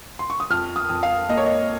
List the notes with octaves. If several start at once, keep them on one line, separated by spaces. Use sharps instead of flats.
C6
C#6
D#6
F2 F6
D#6
F2
F5
A#3 D#5
C#5
D#5